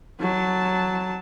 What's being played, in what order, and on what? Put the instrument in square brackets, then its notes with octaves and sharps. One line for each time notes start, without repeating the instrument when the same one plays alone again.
[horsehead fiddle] F#3 A5